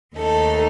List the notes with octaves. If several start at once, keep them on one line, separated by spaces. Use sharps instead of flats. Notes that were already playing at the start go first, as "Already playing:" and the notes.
D#2 D#3 A3 D#4 A4